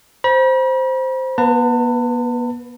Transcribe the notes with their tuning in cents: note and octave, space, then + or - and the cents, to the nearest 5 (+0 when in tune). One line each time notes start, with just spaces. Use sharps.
C5 +0 B5 -45
B3 -40 B4 +5 A5 +40